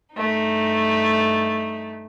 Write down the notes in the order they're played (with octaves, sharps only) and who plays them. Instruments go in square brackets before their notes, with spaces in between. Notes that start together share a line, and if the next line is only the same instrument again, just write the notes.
[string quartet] G2 A3 D#4